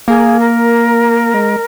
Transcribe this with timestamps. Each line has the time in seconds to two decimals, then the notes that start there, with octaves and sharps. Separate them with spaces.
0.08 A#3 G#4
0.39 A#4
1.34 G#3